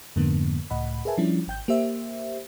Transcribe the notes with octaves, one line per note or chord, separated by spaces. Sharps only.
F2 G#2 D3 A#3 B3
C#2 A2 D#5 F#5 B5
G#4 A#4 B4 E5 G#5 A5
F3 G3 C#4 D4 E4
G#1 G5 G6
A#3 G4 C5 E5